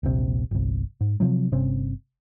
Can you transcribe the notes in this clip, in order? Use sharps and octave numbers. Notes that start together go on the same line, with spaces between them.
D#1 A#1 C3
G1 C2
G#2
C3 F3 F#3
G1 C3 C4 C#4